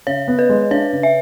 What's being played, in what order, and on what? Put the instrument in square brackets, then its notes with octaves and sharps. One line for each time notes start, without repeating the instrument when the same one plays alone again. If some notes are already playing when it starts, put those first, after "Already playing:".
[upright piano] C#3 [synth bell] C#5
[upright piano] B3
[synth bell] B4
[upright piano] G#3
[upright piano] D4 [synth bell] C#5
[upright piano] C#3
[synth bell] E5